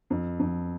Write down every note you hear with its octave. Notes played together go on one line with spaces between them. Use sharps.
F2
F2